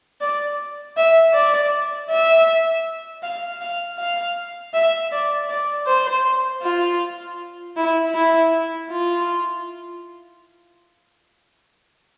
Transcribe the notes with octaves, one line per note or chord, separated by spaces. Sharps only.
D5
E5
D5
E5
F5
F5
F5
E5
D5
D5
C5
F4
E4
E4
F4